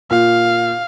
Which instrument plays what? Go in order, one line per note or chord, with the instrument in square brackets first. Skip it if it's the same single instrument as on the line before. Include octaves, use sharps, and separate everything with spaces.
[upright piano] A#2 [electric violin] F5